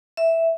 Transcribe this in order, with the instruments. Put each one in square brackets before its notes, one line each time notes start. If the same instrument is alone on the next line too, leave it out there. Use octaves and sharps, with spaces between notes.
[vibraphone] E5